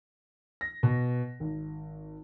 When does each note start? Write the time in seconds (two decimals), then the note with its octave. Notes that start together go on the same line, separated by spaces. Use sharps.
0.61 A#6
0.83 B2
1.40 G#1